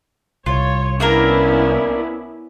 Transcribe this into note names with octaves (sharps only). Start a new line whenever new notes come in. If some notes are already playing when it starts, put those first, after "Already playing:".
C2 F4 C#5
A#3 B3 C#4 D4 E4 A#4